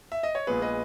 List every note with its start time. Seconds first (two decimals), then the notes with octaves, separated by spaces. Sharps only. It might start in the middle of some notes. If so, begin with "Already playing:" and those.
0.12 E5
0.23 D#5
0.35 C#5
0.47 A#1 A#2 G#3 B3 G#4 B4
0.62 B4 D#5